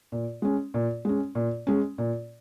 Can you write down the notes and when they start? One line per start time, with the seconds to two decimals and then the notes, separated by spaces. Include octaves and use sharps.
0.12 A#2
0.42 G#3 C#4
0.74 A#2
1.05 G#3 C#4
1.35 A#2
1.67 G#3 C#4
1.98 A#2